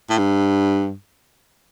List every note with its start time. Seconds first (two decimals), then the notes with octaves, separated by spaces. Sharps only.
0.10 A2
0.18 G2